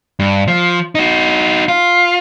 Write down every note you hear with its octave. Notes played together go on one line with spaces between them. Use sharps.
G2
F3
D#4 F#4
F4